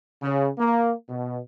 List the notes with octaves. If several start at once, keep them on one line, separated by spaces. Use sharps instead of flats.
C#3
A#3
B2